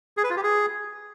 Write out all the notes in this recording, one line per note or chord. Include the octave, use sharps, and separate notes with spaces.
G#4
B4
F4
G4
G#4